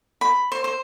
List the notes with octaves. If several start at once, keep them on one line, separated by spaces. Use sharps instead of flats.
B5
C5
C5